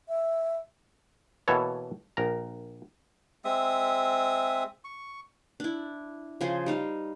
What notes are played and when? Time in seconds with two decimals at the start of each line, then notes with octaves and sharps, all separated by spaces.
0.09 E5
1.48 B2 E3 A#3 A4 C#5
2.17 A#1 A#4 A#5
3.45 G#3 C4 E5 D#6
4.84 C#6
5.60 D4 E4
6.41 C#3 F3 G#4 C5
6.66 G3 D#4 F5